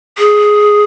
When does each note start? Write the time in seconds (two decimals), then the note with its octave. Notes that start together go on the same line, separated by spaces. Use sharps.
0.18 G#4